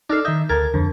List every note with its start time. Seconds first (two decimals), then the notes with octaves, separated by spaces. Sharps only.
0.10 D4 D#4 A4 F6 C7
0.25 D#3 D#5 E5 G6
0.49 D2 A#4 G#6 A6
0.74 F2 D3